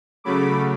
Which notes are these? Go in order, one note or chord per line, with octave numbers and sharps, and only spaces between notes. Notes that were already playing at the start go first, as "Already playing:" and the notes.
C#3 F#3 A3 B5 D6